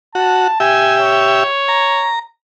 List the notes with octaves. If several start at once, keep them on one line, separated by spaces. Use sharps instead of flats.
F#4 A5
G4 E5 G#5
C#5
A#5